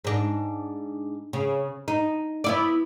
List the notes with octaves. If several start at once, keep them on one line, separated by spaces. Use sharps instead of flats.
G#2 D4
C#3
D#4
B3 E4 D5